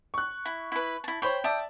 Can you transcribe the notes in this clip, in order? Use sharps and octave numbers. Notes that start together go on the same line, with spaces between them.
C#6 F#6
E4
E4 B4
E4 A5
C5 C#5 G5 B5 C#6
D5 E5 G5 A5 D#6